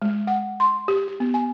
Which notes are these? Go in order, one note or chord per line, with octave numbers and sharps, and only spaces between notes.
G#3
F#5
C6
G4
G4
B3
G#5